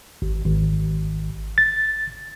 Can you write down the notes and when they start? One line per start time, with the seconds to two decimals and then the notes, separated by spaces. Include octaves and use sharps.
0.22 G#1
0.45 G#1
1.58 A6